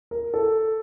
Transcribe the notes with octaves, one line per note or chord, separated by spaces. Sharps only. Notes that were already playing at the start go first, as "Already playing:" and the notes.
A#4
A4